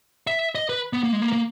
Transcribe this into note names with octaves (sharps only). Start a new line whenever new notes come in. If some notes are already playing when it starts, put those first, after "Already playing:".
E5
D#5
B4
B3
A#3
G#3
A#3
A#3